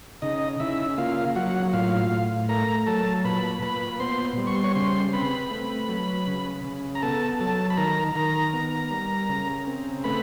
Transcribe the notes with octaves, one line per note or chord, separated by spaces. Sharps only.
C#3 D#4 D#5
C#3 E4 E5
A#3 F4 F5
F#3 F#4 F#5
A2 F4 F5
A2
A3 A#4 A#5
F#3 A4 A5
A#2 B4 B5
A#2 B4 B5
B3 C5 C6
G3
C#6
C6
C#5 C#6
C#3 C5 C6
C4 B4 B5
A3
F#3
C#3
C#3
A#5
B3 A4 A5
F#3 A4 A5
B5
D#3 A#4 A#5
D#3 A#4 A#5
B3
G3
C#3
C4
A3 B4 B5